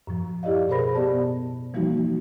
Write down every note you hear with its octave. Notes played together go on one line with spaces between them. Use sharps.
F#2 A2 F3
E4 G4 D5 D#5 F5
B2 G#4 A#4 C5 B5 A#6
B3 G4 D5 A5
E3 F3 G3 A#3 D#4 F#4